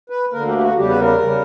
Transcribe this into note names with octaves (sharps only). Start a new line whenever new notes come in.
B4
D2 D3 A#3 A#4
G4
G4
F#4
E2 C#3 G3 G4
B4
A#4
C#3 G3